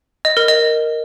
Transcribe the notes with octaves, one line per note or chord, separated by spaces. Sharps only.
D#5
A#4
D#5